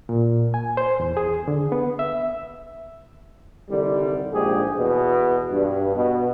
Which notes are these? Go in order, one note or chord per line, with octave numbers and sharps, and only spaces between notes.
A#2
G#5
C5
E2
G#4
D3
B3
E5
C2 D3 D#3 G3
A#1 G#2 G4 G#4
E2 B2
G2
B2